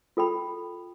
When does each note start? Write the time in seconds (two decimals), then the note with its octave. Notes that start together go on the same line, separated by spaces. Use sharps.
0.17 F4 A4 G5 B5